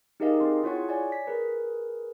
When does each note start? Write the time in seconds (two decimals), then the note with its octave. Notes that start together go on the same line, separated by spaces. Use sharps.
0.20 D#4 G4 G#4 A#4 D#5 F5
0.40 C4 G#4 C6
0.63 E4 F4 G#4 C#5 F#5 C#6
0.89 C#5 D5 G#5
1.12 B6
1.27 G#4 A#4 B4